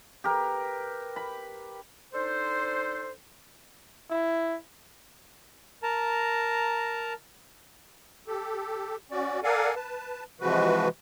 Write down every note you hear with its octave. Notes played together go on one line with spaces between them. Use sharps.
G4 A#4 B4
B5
D4 D#4 A4 C5
E4
A#4 A5 A#5
G4 A4
C#4 F#4 D5
A4 A#4 D5 F5 F#5 G#5
B4 A5
C3 E3 F3 G#3 F#4 B4